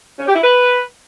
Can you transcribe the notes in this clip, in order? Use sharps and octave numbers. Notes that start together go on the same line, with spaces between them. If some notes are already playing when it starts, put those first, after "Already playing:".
C#4
G4
E4
B4